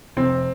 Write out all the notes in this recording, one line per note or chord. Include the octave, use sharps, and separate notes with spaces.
F1 C4